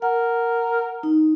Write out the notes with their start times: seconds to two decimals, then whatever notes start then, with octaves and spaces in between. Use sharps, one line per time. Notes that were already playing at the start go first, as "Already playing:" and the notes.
0.02 A#4 F#5
1.03 D#4